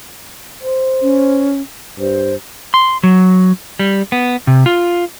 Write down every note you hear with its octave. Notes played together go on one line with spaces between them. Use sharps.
C5
C#4
G2 C5
C6
F#3
G3
B3
C3
F4